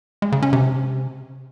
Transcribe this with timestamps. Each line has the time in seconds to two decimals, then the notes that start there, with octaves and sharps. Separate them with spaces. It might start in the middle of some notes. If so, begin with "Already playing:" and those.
0.22 G#3
0.32 C#3
0.42 C#4
0.53 C3